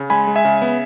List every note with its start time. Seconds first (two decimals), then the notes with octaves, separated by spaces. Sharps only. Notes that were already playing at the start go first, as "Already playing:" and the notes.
Already playing: C#3
0.10 G#3 G#5 B5
0.27 G#3
0.36 E5 G#5
0.45 C#3
0.62 B3